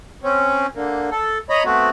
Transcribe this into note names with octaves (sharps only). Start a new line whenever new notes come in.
C4 C#4
D3 A#3
A4
C#5 D#5 A#5 B5
A3 B3 C4 F#4